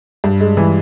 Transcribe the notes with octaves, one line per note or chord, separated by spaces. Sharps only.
G2
G#3
E3